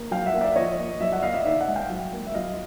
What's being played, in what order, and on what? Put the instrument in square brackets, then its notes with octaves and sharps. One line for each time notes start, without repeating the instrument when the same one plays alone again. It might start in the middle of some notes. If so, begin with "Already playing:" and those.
Already playing: [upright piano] A#3
F#3 F5 G5
E5 F#5
A#3
D5 E5
F3 C#5 D#5
A#3
F#3 D5 E5
E5 F#5
A#3 D#5 F5
D5 E5
D#3 D5 E5
E5 F#5
G#3
F5 G5
F#3
A#3
E5
F#3 D#5 F5